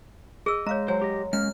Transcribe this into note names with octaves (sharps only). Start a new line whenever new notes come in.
G#4 D#5 E6
G#3 C#5 F5 A#5
F#3 C5 G#5
G4 D#5
G#3 A#3 C#4 F6